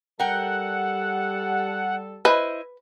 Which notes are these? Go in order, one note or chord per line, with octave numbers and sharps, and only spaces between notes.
G3 A4 A#4 F#5 G5
E4 B4 C5 D#5